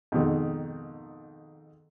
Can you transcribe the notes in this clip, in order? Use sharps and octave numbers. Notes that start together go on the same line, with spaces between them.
F2 G#2 B2 D#3